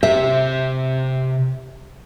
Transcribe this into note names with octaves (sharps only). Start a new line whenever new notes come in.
C3 G4 E5